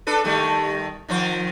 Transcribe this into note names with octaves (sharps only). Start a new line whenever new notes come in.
D4 A4 B4
D#3 G3 A3
D#3 F3 C5